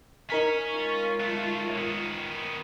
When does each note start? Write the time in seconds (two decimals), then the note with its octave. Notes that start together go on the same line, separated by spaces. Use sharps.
0.30 C#4 D#4 A#4 B6
0.73 G#3 F4
1.20 F#3 A3
1.78 D#3 B3